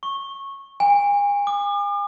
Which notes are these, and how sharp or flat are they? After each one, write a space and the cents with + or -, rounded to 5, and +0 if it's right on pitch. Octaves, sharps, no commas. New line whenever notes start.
C#6 -15
G#5 -40
D6 +45